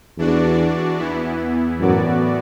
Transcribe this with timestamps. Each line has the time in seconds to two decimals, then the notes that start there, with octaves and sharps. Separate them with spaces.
0.18 E2 E3 D4 F#4 D5
0.99 E2 E3 B3 E4
1.80 F#2 A2 E3 B3 F#4 D5